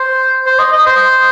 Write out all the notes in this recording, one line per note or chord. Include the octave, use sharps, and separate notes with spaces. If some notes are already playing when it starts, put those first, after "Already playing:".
Already playing: C5
C5
D#5
D#5
C5